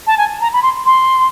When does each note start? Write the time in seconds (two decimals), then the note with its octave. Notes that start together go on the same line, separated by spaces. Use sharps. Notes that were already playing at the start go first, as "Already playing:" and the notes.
0.07 A5
0.18 G#5
0.41 A#5
0.53 B5
0.62 C6
0.86 C6